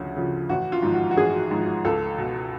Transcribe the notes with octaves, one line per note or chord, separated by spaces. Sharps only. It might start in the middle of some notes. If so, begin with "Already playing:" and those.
Already playing: D2 C#3 F3 F#4
C#3 F3
A1 F#4
F4
G#2 F3
F#4
F#4
A1 G#4
G#2 F3
C#2 A4
B2